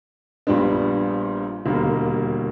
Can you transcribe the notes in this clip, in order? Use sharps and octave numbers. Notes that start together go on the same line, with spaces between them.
A#1 A#2 G3 B3 D4
E1 D#2 D3 G3 A#3